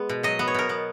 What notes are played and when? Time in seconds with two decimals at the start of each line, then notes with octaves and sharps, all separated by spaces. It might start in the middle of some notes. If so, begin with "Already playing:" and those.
Already playing: G#3 B3
0.09 B2
0.23 F#3 D#5
0.39 B3
0.48 C#5
0.54 B2 A#4
0.69 B3